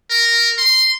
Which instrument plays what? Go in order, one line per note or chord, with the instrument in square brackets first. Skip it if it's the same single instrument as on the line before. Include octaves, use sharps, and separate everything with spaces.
[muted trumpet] A#4
C6